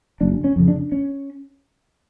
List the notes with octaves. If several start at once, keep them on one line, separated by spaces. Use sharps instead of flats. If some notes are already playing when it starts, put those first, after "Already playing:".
F#1 D4
C#4
F2 C#3
D4
C#4